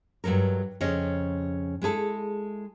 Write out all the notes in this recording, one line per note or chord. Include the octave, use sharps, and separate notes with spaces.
G2 F#3 G#3 A4 A#4
F2 C#3 C#4 D#5
G#3 E4 G#4 A4